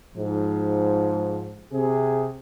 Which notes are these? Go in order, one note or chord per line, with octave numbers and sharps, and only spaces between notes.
G#2 F3
C3 G#4